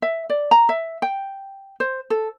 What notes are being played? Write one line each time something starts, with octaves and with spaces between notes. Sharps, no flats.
E5
D5
A#5
E5
G5
C5
A4